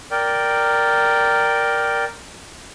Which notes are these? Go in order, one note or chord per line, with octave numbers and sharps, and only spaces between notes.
A#4 D5 G5